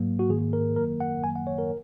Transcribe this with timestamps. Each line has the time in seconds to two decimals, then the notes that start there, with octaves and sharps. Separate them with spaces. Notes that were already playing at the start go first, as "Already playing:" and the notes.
Already playing: G#2 F#3 A#3
0.19 F#4
0.29 G#2 D#3 A#3 G#4
0.53 A#4
0.76 F#2 D#3 F#3 A#3 A#4
1.00 F#5
1.23 F#2 D#3 F#3 A#3 G#5
1.36 F#5
1.47 C#5
1.58 A#4